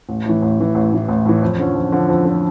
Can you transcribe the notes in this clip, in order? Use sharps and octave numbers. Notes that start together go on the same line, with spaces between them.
A1
A2 E3
A1
A2 E3
A1
A2 E3
A1
A2 E3
F2
D3 F3 C#4
F2
D3 F3 C#4
F2
D3 F3 C#4